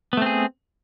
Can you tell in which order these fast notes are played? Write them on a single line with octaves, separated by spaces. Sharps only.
B3 A3 C4 G#4